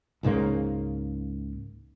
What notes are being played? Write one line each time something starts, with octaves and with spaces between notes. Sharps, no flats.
C#2 G#2 C#3 A#3